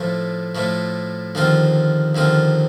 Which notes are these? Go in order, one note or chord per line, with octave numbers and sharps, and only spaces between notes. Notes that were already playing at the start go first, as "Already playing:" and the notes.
Already playing: A2 F3 A3
A2 F3 A3
D#2 D3 F3 C4 F4
D#2 D3 F3 C4 F4